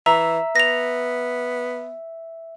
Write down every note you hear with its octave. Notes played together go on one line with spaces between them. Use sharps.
E3 E5 A#5
B3 A#6 F7